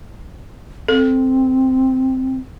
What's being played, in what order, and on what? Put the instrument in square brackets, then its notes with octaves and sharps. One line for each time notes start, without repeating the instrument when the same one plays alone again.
[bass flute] C4 [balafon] A4